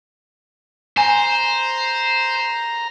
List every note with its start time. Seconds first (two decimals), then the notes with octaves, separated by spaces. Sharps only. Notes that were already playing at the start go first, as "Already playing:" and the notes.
0.97 C5 G#5 A#5